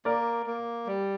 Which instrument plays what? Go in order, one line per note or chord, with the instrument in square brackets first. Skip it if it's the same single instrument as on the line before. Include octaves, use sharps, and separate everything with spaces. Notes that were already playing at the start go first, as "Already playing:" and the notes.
[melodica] A#3 [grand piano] A#4 D5
[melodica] A#3
G3